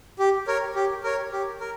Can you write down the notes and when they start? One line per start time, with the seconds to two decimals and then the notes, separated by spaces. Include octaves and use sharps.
0.19 G4
0.47 A#4 C#5
0.75 G4
1.04 A#4 C#5
1.32 G4
1.60 A#4